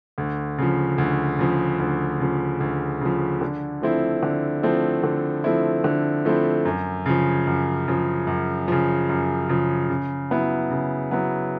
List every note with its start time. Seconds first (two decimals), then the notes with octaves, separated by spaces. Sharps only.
0.18 D2
0.58 C#3 F3
0.98 D2
1.39 C#3 F3
1.80 D2
2.20 C#3 F3
2.60 D2
3.01 C#3 F3
3.41 D3
3.82 F3 A3 C4 E4
4.23 D3
4.63 F3 A3 C4 E4
5.04 D3
5.44 F3 A3 C4 E4
5.84 D3
6.25 F3 A3 C4 E4
6.65 F#2
7.06 C#3 F3
7.47 F#2
7.88 C#3 F3
8.27 F#2
8.68 C#3 F3
9.09 F#2
9.49 C#3 F3
9.89 C#3
10.30 F#3 B3 E4
10.71 C#3
11.11 F#3 B3 E4